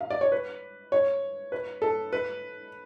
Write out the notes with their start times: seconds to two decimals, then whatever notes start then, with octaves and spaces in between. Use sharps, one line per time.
0.01 F5
0.10 D5
0.21 C#5
0.32 B4
0.92 C#5
1.52 B4
1.82 A4
2.13 B4